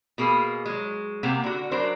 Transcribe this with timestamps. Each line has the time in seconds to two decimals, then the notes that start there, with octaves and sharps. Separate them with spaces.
0.18 B2 A#3 G#4
0.66 F#3 G#3
1.23 C3 A#3 G4 F#5
1.44 D3 F#4
1.71 F#3 D4 A#4 C5